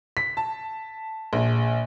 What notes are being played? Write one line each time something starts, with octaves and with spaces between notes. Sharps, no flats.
B6
A5
A#1